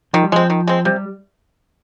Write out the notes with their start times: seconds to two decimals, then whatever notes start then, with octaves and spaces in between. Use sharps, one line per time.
0.13 D#3 F3
0.23 G3
0.32 F3 G#3 C4
0.50 D#3
0.67 G#3 C4
0.85 C3 G3